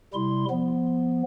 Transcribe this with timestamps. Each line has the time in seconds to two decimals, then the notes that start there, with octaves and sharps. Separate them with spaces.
0.14 C3 G3 E4 C6
0.50 F3 B3